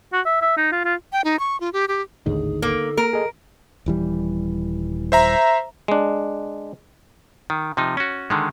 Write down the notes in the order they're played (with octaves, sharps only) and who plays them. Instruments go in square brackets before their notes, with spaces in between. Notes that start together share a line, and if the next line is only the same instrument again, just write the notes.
[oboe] F#4
E5
E5
D#4
F4
F4
[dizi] G5
D#4
C#6
F4
G4
G4
[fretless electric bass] G#1 D#2 A2 [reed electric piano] D3 D#4 [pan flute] G#4
[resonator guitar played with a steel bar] A#3 [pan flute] A4
[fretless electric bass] A#3 [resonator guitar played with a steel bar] A#4
[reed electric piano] G#4 A4 D#5
[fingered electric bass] D#1 E3 G3
[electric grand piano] C5 E5 A#5
[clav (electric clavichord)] G#3 D4
D#3
C3 F3 D#4
C#4 F#4
D3 D#3 G#3